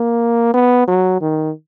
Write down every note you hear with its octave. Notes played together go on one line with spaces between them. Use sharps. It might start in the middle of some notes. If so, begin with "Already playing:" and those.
Already playing: A#3
B3
F#3
D#3